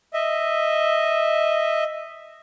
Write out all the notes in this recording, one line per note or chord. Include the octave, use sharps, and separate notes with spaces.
D#5 E5